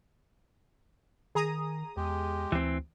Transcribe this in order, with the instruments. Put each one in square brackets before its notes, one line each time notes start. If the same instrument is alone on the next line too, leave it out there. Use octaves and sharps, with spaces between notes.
[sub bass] D#3 [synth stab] G#4 A#5 D#6
[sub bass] E2 [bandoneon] G#3 G4
[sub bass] D2 [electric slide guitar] E3 C4